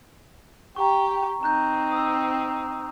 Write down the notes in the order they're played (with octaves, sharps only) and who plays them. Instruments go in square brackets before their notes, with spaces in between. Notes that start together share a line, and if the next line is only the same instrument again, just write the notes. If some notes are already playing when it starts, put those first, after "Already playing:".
[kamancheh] G4 G5 [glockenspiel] A#5 C#6
[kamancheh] C4 D#4 [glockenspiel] A#5 F#6 G6
[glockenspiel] D#6 E6